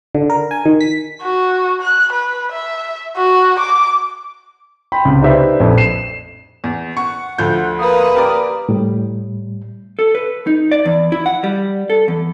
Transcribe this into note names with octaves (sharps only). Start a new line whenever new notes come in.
D3
A#4
G#5
D#3
B6
F#4
F#6
B4
E5
F#4
D6
G5 B5 C6
C#2 C3
D#4 G4 B4 C5 D5 E5
A#1 F2 A2
C7 E7
E2
F#5 C#6
D2 F3 G6
A#3 B4 D#6
G4 A#4 D5
A2 G3
A4
B4
D#4
D5
E2
E4
F#5
G3
A4
E2